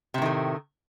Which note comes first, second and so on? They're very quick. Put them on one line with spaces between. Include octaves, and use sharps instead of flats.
C3 A2 D#3 A3